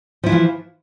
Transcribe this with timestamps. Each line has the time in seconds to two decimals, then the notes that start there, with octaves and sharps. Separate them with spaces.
0.23 F3
0.26 E4
0.29 E3
0.32 F4